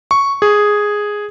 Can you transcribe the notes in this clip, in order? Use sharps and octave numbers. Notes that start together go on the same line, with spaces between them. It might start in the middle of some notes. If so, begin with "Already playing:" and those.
C#6
G#4